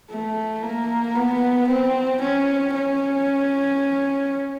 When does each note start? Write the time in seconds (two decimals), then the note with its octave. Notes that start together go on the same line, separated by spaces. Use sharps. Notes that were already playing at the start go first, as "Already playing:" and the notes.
0.11 A3
0.63 A#3
1.16 B3
1.68 C4
2.21 C#4
2.74 C#4